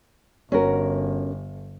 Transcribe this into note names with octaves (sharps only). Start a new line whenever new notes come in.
G1 C#4 F#4 A#4